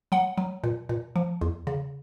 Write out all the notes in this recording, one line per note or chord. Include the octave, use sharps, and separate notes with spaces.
F#3 F#5
F#3
A#2
A#2
F3
E2
C#3